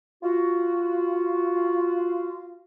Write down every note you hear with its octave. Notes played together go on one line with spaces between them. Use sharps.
F4 F#4